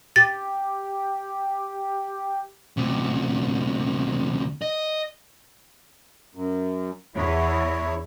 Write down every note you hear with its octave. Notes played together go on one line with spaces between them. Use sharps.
G4 A6
D2 C3
D#5
F#2
E2 E4 C#5